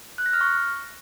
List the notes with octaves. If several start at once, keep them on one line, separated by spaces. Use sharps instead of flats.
F#6
A#6
F6
C#6